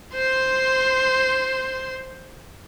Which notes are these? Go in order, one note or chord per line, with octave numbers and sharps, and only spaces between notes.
C5 C6